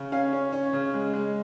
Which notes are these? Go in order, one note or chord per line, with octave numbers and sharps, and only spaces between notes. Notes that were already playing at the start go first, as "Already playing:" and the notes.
Already playing: C#3
C#4 F5
C#4
C#4
C#3
G#3
G#3